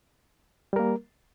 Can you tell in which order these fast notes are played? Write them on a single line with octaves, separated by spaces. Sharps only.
G3 A#4 A#3